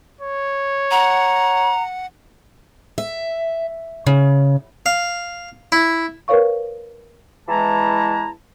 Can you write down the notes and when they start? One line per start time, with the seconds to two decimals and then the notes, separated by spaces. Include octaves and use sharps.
0.21 C#5
0.91 F#5 A#5
2.98 E5
4.07 C#3
4.86 F5
5.72 E4
6.28 A#4 B4 C#5 F5 C#6
7.48 E2 E3 G#3 E4 A5 A#5